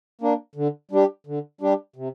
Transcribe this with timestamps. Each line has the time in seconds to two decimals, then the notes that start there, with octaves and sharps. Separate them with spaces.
0.21 A#3 D4
0.55 D3
0.91 G3 D4 G4
1.27 D3
1.61 G3 D4 G4
1.96 C3